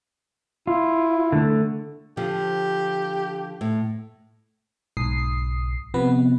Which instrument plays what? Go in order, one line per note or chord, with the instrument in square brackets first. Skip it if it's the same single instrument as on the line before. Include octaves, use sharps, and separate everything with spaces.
[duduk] E4 [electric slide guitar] F4
[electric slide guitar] D3 A3
[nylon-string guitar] D3 F3 [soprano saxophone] G4
[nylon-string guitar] A2
[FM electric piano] B1 G#2 D#6 C7
C3 F3 B3 B4